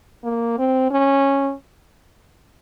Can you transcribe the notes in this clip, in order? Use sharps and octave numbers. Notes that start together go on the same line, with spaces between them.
A#3
C4
C#4